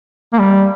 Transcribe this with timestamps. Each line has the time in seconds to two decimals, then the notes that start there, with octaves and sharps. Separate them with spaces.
0.33 A#3
0.39 G3